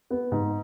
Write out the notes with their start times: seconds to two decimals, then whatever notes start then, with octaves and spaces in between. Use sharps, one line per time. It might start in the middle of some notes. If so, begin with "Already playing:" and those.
0.10 B3
0.32 G#2